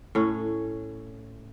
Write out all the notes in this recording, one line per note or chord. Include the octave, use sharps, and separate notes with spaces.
A2 C#4